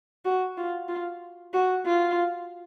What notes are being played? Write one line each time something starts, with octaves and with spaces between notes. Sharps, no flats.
F#4
F4
F4
F#4
F4